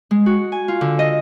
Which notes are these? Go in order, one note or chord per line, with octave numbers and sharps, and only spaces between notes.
G#3
F#4
G#5
F4
D3
D#5